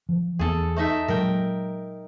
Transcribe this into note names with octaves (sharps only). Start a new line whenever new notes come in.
F3
E2 B3 G#4 A4
A3 D#4 E5
A#2 F#3 G#3 A#4 G5